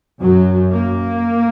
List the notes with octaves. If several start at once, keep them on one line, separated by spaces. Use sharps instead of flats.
F#2 F#3
A#3